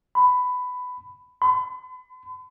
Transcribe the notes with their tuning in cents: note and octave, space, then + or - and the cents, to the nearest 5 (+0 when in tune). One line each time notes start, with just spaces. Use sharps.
B5 +15
B5 +45